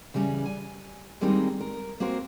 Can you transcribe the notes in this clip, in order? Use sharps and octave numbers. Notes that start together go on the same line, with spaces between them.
C#3 E3 G3 C#4
G#5
D#3 G3 G#3 A#3 C4 D#4
A#4
A#3 C4 F#4 A#4 C5